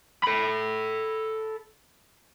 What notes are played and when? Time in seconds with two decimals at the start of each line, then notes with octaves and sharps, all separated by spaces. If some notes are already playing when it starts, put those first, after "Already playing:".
0.24 A4 B5